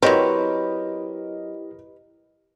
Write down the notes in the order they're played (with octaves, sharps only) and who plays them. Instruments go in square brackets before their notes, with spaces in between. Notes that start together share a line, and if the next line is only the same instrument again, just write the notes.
[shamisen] F#3 C4 [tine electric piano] E4 G4 [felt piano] A#4 D#5 [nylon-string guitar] B4 C#5